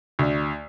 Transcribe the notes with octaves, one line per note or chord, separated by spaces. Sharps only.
D2